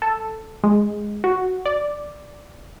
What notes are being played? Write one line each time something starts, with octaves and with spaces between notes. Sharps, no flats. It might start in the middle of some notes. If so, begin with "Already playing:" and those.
A4
G#3
F#4
D5